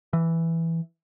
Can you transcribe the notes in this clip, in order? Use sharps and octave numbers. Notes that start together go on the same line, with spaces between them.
E3